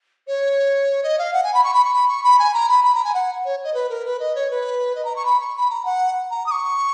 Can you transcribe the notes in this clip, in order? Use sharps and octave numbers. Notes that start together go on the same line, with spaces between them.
C#5
D#5
F5
F#5
G#5
B5
C#6
B5
C#6
B5
C#6
B5
G#5
A#5
B5
B5
A#5
G#5
F#5
C#5
D#5
B4
A#4
B4
D#5
C#5
B4
D#5
A#5
C#6
B5
C#6
B5
A#5
F#5
A#5
D#6
C#6